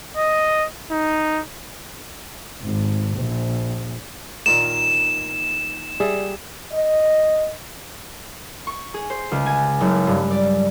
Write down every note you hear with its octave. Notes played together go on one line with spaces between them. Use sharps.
D#5
D#4
G#1
A#1
A#2 D#3 A#3 E7
G3 G#4 E5
D#5
C#6
G#4
C5
C#2
G#5
F#1
G2
D5